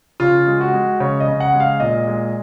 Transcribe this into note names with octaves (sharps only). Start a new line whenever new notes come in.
C#3 F4
G#3
F#4
G#3
C#3 C#5
D#5
C#3
F#5
G#3
F5
A#2 D#5
G#3